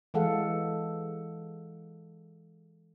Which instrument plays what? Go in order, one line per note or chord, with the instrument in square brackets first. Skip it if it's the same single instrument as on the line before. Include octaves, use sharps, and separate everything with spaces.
[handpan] E3 G#3 A4 F5 F#5